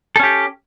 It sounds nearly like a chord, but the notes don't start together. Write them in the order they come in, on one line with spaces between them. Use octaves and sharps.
A4 C#4 G4